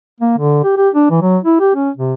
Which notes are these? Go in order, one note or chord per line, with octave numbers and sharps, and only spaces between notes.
A#3
D3
G4
G4
D4
E3
F#3
E4
G4
C#4
C3